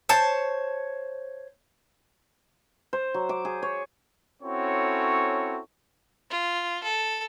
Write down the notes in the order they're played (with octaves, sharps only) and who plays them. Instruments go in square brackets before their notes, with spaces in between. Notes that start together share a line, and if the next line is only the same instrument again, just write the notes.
[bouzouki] C5 C#5 A5
[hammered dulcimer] C5
F#3
D6
G#4
C#5
[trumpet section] C4 C#4 E4 F#4 A4 C#5
[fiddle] F4
A4